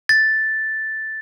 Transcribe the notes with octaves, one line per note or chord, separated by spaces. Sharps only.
A6